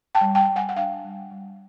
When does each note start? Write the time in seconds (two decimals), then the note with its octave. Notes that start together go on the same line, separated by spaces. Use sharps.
0.15 G5 A5
0.21 G3
0.35 G5 A5
0.48 G3
0.56 F#5 G#5
0.69 F#5
0.76 D4 F5 G5
1.05 G3
1.32 G3